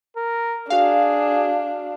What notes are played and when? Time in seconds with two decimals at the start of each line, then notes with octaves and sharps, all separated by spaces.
0.17 A#4
0.70 D4 F#4 G#4 F5